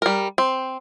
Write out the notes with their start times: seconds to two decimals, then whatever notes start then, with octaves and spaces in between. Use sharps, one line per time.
0.02 G3 A#4
0.38 C4